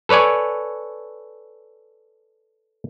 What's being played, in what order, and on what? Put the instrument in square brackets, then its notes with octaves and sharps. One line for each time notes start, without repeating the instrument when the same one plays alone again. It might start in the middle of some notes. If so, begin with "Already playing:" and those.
[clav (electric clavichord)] A4 B4 C#5 D5 G#5